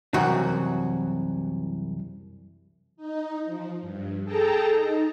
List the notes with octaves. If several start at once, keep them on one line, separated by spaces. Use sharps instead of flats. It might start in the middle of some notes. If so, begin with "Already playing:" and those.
C2 F#2 E3 F#4
D#4
F3
G2
G#4 A4 G5 A5 A#5
D#4